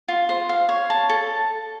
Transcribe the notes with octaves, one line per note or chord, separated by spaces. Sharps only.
F4
C5
F5
C#5
A5
A4